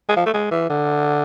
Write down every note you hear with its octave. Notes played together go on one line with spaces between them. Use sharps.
G#3
F3
A3
G#3
E3
D3